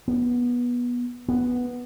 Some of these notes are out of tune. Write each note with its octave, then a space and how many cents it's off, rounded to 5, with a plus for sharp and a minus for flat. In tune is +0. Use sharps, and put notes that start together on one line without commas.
B3 -20
B3 -5